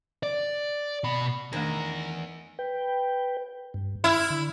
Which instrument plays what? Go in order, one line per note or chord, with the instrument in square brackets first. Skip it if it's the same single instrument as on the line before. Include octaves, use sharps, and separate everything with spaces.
[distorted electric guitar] D5
B2 B5
[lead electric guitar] E2 [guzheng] D#3 [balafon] A3 D4 C5 [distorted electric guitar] A#4
[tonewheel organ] B4 G5
G2
[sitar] E4 [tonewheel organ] E6 F6
[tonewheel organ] D3